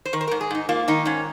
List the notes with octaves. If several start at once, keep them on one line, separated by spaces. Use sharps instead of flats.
C5
D#3 A#4
C5
G#2 A#4
G#4
G#2 D#4
A#3 F4
D#3 D#4
G#2 C#4